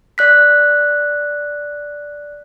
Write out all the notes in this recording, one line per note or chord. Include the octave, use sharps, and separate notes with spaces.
D5 F#6 B6